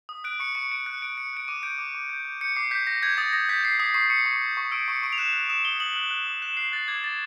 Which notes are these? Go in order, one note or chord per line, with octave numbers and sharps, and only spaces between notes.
D#6
F#6 D7
C#6 C#7
C#6 C#7
C#6 D7
F#6 C#7
F#6 D7
F#6 C#7
F#6 D7
D6 D#7
G6 D7
D6
D6
G6
G6
G6 C#7
D6 C7
G6 B6
G6 A#6
G6 G#6
D#6 A6
D#6 A#6
G6 B6
G6 C7
D#6 B6
C#6 C7
C#6 C#7
C#6
G6
C#6
E6 D7
C#6 C#7
C#6 D7
F7
F#6 E7
F#6
D#6 E7
D#6 G7
D#6 F#7
F#6
F#6
D#6
F#6 E7
F#6 C7
F#6 A6
D6 G#6
D6 A6